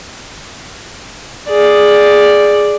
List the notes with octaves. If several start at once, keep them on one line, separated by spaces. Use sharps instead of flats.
G#4 D5